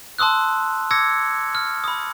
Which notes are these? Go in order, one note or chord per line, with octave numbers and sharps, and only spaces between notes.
A5 C6 D#6 E6 F#6
D6 E6 G#6 A#6 C#7
F6
B5 D#6